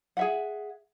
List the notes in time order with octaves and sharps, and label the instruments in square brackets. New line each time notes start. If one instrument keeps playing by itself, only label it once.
[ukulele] G#4 E5 F#5